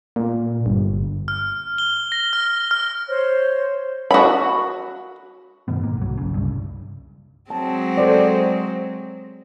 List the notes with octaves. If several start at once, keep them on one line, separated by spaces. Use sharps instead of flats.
A#2
G1
F6
G7
A#6
F6
F6
C5 C#5
F#4 B5
G2 B2 D#3 B3
G#2 A#3
C2 F#3
G1 C#3
C2 G2
F#3 G#3 C4 A5
A4 C5 D5